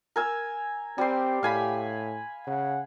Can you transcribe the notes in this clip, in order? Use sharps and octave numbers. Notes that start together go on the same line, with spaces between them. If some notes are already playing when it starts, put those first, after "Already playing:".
A#4 G#5 E6
G3 C4 G4 C6
A2 F5 G#5 B5
C#3 F#5